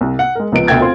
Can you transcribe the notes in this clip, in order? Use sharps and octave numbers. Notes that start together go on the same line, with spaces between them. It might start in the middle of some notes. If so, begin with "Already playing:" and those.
C2
F#5
G#3 A#4
C#2 F3 B3 D7
D2 B2 A3 G5 G#6 A6
C4 F4 C6